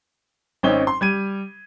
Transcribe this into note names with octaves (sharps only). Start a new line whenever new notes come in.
G#1 C4 C#4 D#4 G7
C6
G3 G#6 D#7